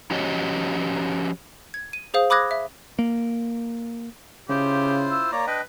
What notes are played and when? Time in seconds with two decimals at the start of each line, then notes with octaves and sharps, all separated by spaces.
0.11 F3 C#4 F#4 G4 C#5 D#5
1.74 G#6
1.93 D#7
2.14 G#4 C5 F5 D#6
2.30 B5 D6 D#6 F#6 G#6 A#6
2.51 E5
2.99 A#3
4.49 C#3 E4 F4 G4 C5
5.11 E6
5.32 A#3 C#5 D5 A#5
5.47 D4 B4 D#5 G5